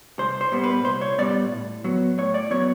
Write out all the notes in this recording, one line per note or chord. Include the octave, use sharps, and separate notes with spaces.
C2 C5
C5
A#2 G3 B3
B4
C2 C5
C#5
A#2 G3 B3 D5
A2
F#3 B3
A2 C#5
D5
F#3 B3 C#5